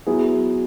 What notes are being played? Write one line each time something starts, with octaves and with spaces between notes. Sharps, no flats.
F#3 B3 E4 G#4